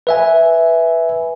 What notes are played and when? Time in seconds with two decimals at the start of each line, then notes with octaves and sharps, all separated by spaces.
0.07 B4 E5 G#5